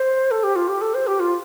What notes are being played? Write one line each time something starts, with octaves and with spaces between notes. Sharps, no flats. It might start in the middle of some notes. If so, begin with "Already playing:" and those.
Already playing: C5
A4
G4
F4
G4
A4
C5
G4
F4